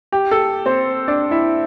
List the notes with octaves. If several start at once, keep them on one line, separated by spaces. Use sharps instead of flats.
G4
A4
C4 C5
D4 D5
E4 E5